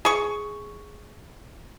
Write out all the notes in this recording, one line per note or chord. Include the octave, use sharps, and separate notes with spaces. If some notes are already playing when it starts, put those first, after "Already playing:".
G#4 C#6